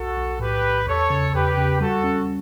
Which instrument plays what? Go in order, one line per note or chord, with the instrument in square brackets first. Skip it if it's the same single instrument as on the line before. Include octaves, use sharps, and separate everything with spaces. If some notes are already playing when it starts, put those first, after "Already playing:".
Already playing: [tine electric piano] B1 [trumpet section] F#4 A4
[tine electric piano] B1
[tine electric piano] A2 [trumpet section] G4 B4
[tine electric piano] B1
[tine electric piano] E2 [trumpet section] A4 C#5
[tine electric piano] C#3
[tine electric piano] E2 [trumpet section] G4 B4
[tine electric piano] C#3
[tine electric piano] G3 [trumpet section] F#4 A4
[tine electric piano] C#4